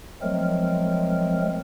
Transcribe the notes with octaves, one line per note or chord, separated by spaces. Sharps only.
F3 F#3 G#3 A3 C4 A#4